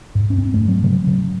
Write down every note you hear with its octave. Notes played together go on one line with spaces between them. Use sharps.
G#2
C#4
G#2 C4
A3
G#2
F#3
C#3 F#3
C#3